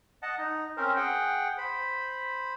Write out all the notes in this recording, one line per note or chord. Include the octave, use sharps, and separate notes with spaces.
D#5 F#5 A5
D#4
C4 C#4 A#4 C5
G#4 F#5 G5
C5 B5